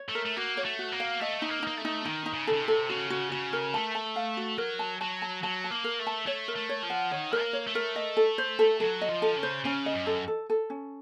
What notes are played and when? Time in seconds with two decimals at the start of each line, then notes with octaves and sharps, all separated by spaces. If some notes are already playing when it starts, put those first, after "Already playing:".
Already playing: C#5
0.09 A3
0.15 A#4
0.25 A3
0.36 A#3 F#4
0.57 C#5
0.64 A3
0.79 F#4
0.92 A#3
1.00 F5
1.20 A3 D#5
1.42 D#4
1.50 A#3
1.62 A#3 D#4
1.77 A3
1.85 D#4
2.05 D#3 D#4
2.26 D#4
2.33 C#3
2.47 A4
2.53 C#3
2.62 C3
2.68 A4
2.89 C#3 F#4
3.10 F#4
3.32 C#3 F#4
3.53 A#4
3.74 A3 A5
3.95 A5
4.16 F5
4.37 F#4
4.58 F#3 A#4
4.79 A5
5.01 F#3 A5
5.22 A5
5.43 F#3 A5
5.64 A5
5.70 A#3
5.84 A#4
5.99 A3
6.07 A5
6.26 A3 C#5
6.48 A#4
6.56 A3
6.69 C#5
6.83 F3
6.90 F#5
7.11 D#3 C#5
7.33 A#4
7.39 A#3
7.53 C#5
7.67 A3
7.75 A#4
7.96 D#5
8.17 A4
8.38 C5
8.59 A4
8.80 F#3 A4
9.01 D#5
9.09 F3
9.22 A4
9.36 C#3
9.43 C5
9.64 C#3 C#4
9.86 D#5
9.93 F#2
10.06 A4
10.28 A4
10.50 A4
10.70 C#4